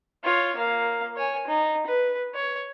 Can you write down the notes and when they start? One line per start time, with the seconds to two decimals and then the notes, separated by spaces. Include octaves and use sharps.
0.24 F4 C#5
0.56 A#3 F5
1.17 C#5 G#5
1.47 D#4
1.87 B4
2.34 C#5